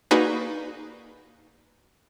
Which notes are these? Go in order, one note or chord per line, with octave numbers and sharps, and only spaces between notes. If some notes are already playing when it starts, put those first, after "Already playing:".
A#3 D#4 F#4 G#4 B4 D5